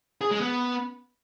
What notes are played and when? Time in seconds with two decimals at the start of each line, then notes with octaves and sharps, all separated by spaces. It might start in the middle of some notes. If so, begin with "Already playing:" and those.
0.21 G#4
0.31 G#3
0.41 B3